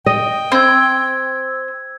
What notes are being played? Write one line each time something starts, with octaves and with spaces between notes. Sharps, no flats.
D#5 G5
C4 E6 G#6